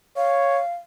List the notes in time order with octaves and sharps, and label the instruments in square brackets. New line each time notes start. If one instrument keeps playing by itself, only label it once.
[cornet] C#5 [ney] F5